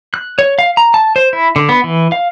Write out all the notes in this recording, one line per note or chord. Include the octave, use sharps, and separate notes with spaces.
F#6
C#5
F5
A#5
A5
C5
E4
D3
B3
E3
F5